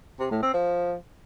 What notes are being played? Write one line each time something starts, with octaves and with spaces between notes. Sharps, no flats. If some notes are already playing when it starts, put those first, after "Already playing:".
C3
A2
C4
F3